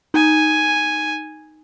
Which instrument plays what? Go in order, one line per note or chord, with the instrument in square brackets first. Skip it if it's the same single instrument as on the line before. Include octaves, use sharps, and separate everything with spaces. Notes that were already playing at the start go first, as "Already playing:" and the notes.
[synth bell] D#4 [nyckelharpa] G#5